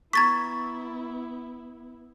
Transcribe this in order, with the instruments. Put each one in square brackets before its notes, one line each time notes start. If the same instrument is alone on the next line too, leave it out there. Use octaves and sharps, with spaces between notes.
[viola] B3 E4 [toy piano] A#5 C#6 [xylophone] G#6 A6 B6